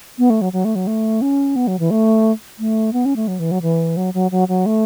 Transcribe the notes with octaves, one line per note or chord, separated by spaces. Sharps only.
B3
A3
F#3
F#3
A3
F#3
A3
C#4
B3
F#3
E3
A3
A3
B3
C#4
A3
F#3
E3
F#3
E3
F#3
F#3
F#3
F#3
A3